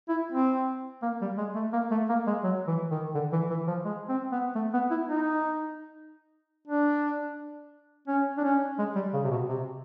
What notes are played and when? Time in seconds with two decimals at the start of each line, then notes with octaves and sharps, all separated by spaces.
0.09 E4
0.32 C4
1.03 A#3
1.21 G3
1.38 G#3
1.55 A3
1.73 A#3
1.91 A3
2.09 A#3
2.27 G#3
2.43 F#3
2.67 E3
2.91 D#3
3.15 D3
3.33 E3
3.50 E3
3.67 F3
3.85 G#3
4.09 C4
4.32 B3
4.55 A3
4.74 B3
4.91 E4
5.08 D#4
6.68 D4
8.08 C#4
8.38 D4
8.44 C#4
8.79 G#3
8.96 G3
9.13 C#3
9.25 C3
9.31 B2
9.49 C3